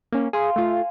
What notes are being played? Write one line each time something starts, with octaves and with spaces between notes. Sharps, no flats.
A#3 C#4
G#4 F5 G#5 C6
A3 F4